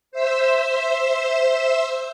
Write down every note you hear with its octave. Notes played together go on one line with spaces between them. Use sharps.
C5 E5 E6